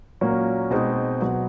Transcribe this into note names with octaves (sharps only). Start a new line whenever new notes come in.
A#2 F#3 A#3 C#4
B2 G#3 C4 D#4
B2 F#3 B3